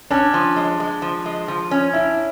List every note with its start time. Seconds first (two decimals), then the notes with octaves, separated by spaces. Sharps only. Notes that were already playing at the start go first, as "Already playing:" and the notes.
0.11 C#4 D4
0.34 F3
0.56 G#3
0.80 G#3
1.02 F3
1.26 G#3
1.48 F3
1.71 C#4
1.93 D4 E4